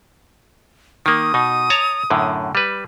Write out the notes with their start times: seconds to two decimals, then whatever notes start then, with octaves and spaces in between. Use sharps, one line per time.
1.06 D#3 A#3 D#6
1.34 B2 D#4
1.70 C#5 A5 A#5
2.10 F#2 A2 D3
2.55 G3 B4